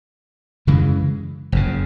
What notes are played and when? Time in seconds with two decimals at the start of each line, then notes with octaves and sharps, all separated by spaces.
0.67 F#2 C#3 E3 G#3
1.52 F#1 F2 C#3